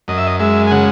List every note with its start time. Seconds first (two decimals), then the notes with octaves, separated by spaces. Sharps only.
0.08 F#2 D#5
0.18 E5
0.27 D#5
0.40 G#3 E5
0.67 G#5
0.71 C#3 F#5